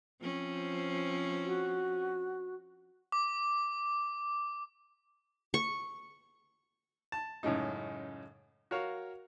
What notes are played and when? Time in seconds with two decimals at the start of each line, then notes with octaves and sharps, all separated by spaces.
0.20 F3 C4 C#4
1.45 F#4
3.12 D6
5.54 C#6
7.12 A5
7.43 F#2 A2 C#3 G#3 D#4
8.71 F#4 A#4 C#5 F5